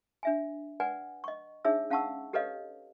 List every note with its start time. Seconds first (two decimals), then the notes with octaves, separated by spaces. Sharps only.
0.23 D4 E5 G#5
0.80 B4 D5 F#5 G#5
1.24 D#5 C#6
1.65 D4 D#4 G#4 C#5 E5 E6
1.90 C#4 F5 F#5 A5 C#6 E6
2.33 G4 A4 B4 C#5 D#5 F5